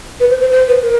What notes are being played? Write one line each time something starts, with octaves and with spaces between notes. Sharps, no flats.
B4
C5
C5
C5
B4
A#4